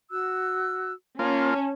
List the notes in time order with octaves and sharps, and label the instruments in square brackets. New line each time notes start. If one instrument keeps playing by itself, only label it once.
[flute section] F#4 E6 F#6
[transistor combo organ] A#3 F4 [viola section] C#4 [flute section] G#5 A5